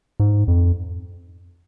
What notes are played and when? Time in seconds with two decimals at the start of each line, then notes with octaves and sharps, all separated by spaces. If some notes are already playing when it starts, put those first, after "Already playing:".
0.20 G#2
0.48 F2